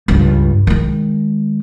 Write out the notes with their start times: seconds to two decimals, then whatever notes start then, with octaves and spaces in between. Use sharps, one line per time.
0.08 C#2 G2
0.67 D#3 G#3